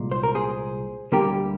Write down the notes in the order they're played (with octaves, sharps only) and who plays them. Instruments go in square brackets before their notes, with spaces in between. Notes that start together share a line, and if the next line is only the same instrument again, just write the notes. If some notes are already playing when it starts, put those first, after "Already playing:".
Already playing: [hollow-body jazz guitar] C2 A#2 G#3
C5
A#4
G#4 C5
D2 D3 G3 A#3 G4 A#4